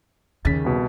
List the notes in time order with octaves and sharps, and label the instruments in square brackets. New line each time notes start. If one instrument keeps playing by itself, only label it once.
[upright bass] D#2 C#3 [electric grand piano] A6 B6
[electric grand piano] C2 B2